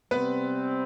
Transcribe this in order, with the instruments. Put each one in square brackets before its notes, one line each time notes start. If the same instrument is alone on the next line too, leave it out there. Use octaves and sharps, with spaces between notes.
[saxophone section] C3 G3 C4 [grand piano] B3 B4